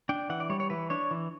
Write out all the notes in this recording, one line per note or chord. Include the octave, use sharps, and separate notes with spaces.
D4 G5
E3 F#5
D5
G3 C#5
C#5
E3 B4
D4 C#5
E3